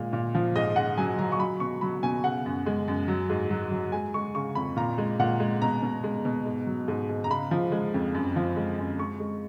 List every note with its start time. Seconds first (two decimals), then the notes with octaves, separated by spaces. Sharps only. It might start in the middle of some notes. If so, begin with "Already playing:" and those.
Already playing: A#2 G#3
0.13 A#2
0.35 F3
0.56 G#2 D#5
0.76 G#2 F#5
0.98 F#3 G#5
1.19 F#3 A#5
1.32 C#6
1.40 F#3 B5
1.60 B2 C#6
1.81 F#3 B5
2.03 B2 G#5
2.24 C#3 F#5
2.46 F#2
2.66 G#3
2.88 F#2
3.08 F#3
3.30 G#2
3.50 F#3
3.71 F#3
3.92 G#3 G#5
4.14 G#3 C#6
4.35 C#3 C#6
4.55 F2 B5
4.76 A#2 A#5
4.98 G#3
5.19 A#2 F#5
5.40 G#3
5.62 B2 A#5
5.82 B2
6.04 G#3
6.25 B2
6.45 G#2
6.67 F#3
6.88 G#2
7.09 G#2
7.24 A#5
7.30 C#3 B5
7.51 F3
7.72 G#3
7.94 F2
8.15 F#2
8.36 F3
8.56 G#3
8.78 F#2
8.99 G#3 C#6
9.20 G#3